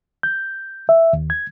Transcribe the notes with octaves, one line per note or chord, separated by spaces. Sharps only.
G6
E5
D#2
G#6